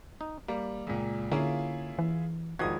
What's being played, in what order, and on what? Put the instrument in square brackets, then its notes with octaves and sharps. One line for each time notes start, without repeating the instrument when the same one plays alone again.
[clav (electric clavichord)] D#4
[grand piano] G3 [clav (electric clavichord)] A#3
[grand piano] C#2 A#2
[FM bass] D3 [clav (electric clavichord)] A#3 C#4 [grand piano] E4 F4 G#4
[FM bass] E3
[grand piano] E1 D#6 G#6 [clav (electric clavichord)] D#3 F3 F#4